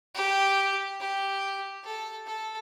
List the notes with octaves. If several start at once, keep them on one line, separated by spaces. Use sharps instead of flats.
G4
G4
A4
A4